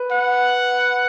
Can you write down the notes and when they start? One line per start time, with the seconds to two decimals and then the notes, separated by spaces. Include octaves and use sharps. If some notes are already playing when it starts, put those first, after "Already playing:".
Already playing: B4
0.12 F#5